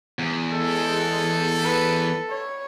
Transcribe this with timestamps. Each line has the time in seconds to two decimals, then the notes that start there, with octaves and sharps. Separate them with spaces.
0.19 E2
0.53 G#3 A4
1.64 B4
2.30 C#5